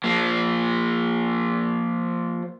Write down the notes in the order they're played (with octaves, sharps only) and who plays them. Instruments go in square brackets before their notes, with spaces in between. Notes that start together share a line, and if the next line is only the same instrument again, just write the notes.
[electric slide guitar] F3 A#3